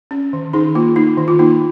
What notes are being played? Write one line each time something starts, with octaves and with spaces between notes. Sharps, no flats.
C#4
D#3
D#3 D#4 G#4
A#3 F4
A#3 D#4
D#3
F4
A#3 D#4